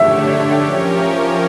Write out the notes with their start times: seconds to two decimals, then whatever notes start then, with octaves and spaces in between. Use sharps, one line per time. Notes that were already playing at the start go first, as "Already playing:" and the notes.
Already playing: D3 A3 D4 G4 C#5 E5
0.62 F3 C#4 G4 A#4 C#5